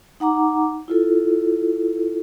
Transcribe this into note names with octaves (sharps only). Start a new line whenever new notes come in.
D#4 F#5 A#5 D6
E4 F4 A4